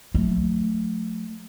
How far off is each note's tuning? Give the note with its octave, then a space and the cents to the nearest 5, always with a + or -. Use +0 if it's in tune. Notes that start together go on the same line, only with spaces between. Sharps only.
F#3 -40 A3 +0